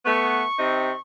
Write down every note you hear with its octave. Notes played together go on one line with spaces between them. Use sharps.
A3 B3 C#6
C3 C4 D#4